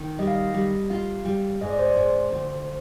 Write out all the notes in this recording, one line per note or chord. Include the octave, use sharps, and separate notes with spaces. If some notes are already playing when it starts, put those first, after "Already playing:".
Already playing: D#3
G3 D#5
F5
D#5
G3
F4 F5
G3
G#2 D#5
D5
C5
D5
G#2 C5
D2